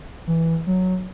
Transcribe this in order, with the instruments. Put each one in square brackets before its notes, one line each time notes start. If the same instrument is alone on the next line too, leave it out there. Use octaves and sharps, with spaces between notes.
[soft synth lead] E3
F#3